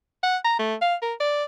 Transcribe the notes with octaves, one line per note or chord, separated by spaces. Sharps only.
F#5
A#5
A3
F5
A#4
D5